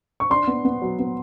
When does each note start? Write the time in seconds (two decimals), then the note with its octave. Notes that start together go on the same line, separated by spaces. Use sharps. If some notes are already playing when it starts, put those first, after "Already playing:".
0.20 C#6
0.30 D4 C6
0.47 B3
0.65 B3
0.82 F#3
0.99 B3